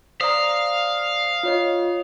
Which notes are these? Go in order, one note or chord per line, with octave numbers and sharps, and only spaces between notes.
C5 D5 F5 A#5 D#6
F4 C#5 D#5